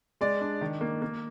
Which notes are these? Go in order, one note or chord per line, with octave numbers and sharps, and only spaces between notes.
G#3 D5
D4
D#3
A#3
A#3